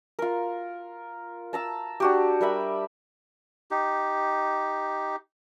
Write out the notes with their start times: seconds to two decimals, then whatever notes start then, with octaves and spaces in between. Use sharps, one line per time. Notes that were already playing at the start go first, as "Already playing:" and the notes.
0.19 F4 A#4
1.53 A5 A#5 E6
2.00 D4 F#4 G4
2.41 G3 A#4 E5 B5
3.71 D#4 G4